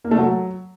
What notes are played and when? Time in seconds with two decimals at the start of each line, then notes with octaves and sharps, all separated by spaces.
0.04 A#3
0.11 A3
0.18 F#3